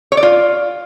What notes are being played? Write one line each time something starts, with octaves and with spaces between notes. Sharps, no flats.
C#5
D5
F4